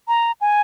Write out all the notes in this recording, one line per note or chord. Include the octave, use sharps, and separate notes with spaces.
A#5
G#5